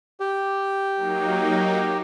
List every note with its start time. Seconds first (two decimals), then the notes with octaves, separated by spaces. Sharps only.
0.20 G4
0.96 F#3 A#3 D#4